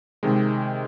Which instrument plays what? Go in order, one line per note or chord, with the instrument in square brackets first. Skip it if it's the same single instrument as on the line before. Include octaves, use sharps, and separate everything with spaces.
[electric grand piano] C3 D#3 G#3